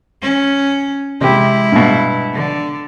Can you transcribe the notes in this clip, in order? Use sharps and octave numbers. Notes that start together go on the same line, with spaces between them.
C#4
C3 G#3 E4 G4
G2 B2
D3